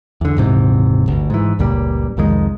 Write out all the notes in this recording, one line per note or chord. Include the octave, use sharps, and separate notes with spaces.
E2 D3
D#1 G#2 C3 E3
G1 D2
G#2 E3
F#1 C#2 A#2 G3
C2 F2 D#3 G#3